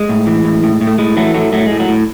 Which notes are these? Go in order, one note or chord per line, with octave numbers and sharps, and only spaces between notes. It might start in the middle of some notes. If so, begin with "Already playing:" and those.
Already playing: G#3
A2
E3
A2
A2
A2
A3
A2 G#3
E3 F#3 A3
A2 F#3 A3
A2 F#3 A3
A2 G#3
F#3
A2